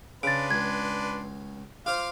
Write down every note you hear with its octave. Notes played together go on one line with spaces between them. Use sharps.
C#3 D4 B4 C6 A6 D7
C#2 G#6
F4 C5 F5 D6 F6